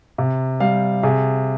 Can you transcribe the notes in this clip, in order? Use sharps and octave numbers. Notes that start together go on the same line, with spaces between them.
C3
G3 F5
C3 G#4